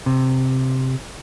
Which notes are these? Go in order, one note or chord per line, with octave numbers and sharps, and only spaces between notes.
C3